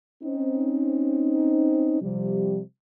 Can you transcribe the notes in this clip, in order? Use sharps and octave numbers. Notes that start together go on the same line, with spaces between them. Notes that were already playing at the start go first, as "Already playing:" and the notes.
C4 C#4 D#4
C3 F3 G3